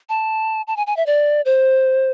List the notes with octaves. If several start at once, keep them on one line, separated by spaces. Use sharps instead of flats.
A5
A5
G#5
G#5
E5
D5
C5